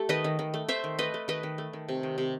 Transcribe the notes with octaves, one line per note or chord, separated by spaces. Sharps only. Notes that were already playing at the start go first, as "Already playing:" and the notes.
Already playing: A3 G4 A4
D#3 B4 D#5
D#3
D#3
A3
A3 C5 E5
D#3
A3 B4 D#5
A3
D#3 B4 D#5
D#3
A3
D#3
C3
D#3
C3